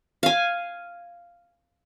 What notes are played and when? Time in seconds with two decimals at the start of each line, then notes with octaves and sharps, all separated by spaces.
0.23 F5 G#5